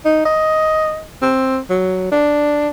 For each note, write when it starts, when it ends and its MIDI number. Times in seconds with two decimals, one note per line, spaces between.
0.05 0.22 63
0.25 1.03 75
1.22 1.59 60
1.70 2.11 54
2.12 2.69 62